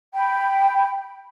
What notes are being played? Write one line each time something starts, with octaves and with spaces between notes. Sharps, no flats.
G5 B5